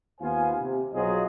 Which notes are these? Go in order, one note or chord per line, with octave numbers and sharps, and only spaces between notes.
D#2 B3 F4 C5 F5 G#5
C3
B1 F#3 F4 G#4 C5 D#5